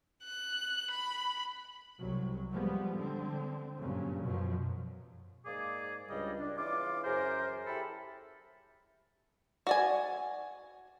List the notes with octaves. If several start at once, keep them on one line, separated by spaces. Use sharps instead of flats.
F#6
B5
C2 F#3
F3 G3 G#3 B3
D3 C4
G2 A#2 C#3 F#3
F#2 B2 F3 F#3
G#2 A#3 G#4 D5 D6
C#2 G2 G3 D#5
D4
C#3 E3 F4 D6
F#2 G#4 A#4 C5
E4 G4 A4 B5
F#4 D5 G#5